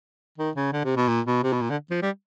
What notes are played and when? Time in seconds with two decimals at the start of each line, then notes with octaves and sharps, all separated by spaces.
0.38 D#3
0.55 C#3
0.72 D3
0.84 C3
0.97 B2
1.08 A#2
1.26 B2
1.43 C3
1.53 B2
1.61 A#2
1.70 D3
1.91 F3
2.02 G3